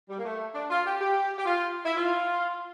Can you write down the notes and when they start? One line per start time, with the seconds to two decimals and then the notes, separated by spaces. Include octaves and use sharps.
0.09 G3
0.18 A#3
0.25 A3
0.54 D4
0.69 F4
0.85 G4
1.00 G4
1.38 G4
1.45 F4
1.85 E4
1.96 F4